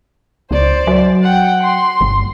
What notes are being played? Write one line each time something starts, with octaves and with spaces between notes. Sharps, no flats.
C#2 C5 D5
F#3
F#5 G5
C6
G1